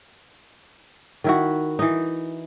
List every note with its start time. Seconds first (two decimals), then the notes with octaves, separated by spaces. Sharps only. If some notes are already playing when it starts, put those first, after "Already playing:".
1.24 D#3 E4 F#4
1.79 E3 D#4